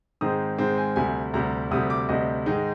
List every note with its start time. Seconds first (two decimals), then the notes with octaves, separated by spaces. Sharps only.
0.21 G#2 D#3 G#3 C4 D#6
0.58 G#2 D#3 G#3 C4
0.78 G#5
0.96 D2 C3 G3 G#5
1.34 D2 C3 G3 A#5
1.71 D2 C3 G3 D#6
1.90 D6
2.09 D2 C3 G3 D#5
2.46 G#2 D#3 G#3 D#4